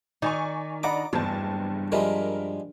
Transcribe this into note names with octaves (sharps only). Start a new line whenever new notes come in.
D#3 D#4 D5 G#5 C#6
D4 D5 D#5 F#5 A#5 B5 D6
F#1 E2 G2 C5 A5
F3 G3 G#3 A#4 E5